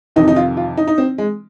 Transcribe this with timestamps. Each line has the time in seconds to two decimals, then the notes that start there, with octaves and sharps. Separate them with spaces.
0.16 F2 C3 D#3 D#4
0.28 D#4
0.36 F4
0.57 F4
0.77 D#4
0.87 D#4
0.98 C4
1.18 G#3